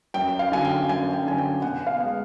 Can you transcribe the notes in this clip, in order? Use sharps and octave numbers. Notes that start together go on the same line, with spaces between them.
F#2 G5
F5
D3 F#3 G#5
G5
F#2 G#5
G5
D3 F#3 G#5
G5
B2 F#5
F5
G#3 B3